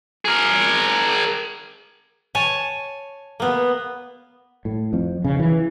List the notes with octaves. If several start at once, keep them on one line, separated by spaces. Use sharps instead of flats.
G#4 A#4
C#5 G#5 A5
A#3 B3
A2
F2
C#3
E3